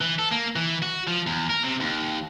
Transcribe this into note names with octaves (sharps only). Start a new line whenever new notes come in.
E3
A4
A#3
E3
F#4
F3
E2
A#4
C3
D#2